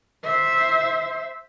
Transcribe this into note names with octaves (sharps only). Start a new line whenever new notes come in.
C5 E5